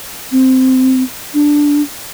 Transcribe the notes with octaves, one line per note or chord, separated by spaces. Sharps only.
C4
D4